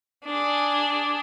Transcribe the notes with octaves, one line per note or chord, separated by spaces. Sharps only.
D4 G#4